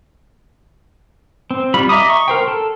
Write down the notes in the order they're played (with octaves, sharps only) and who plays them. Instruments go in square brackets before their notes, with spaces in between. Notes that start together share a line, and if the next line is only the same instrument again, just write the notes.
[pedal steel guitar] C4
G3 F4 B5
D#5 E5 A#5 D6 D#6
C#6
A#4 C5 G5
A4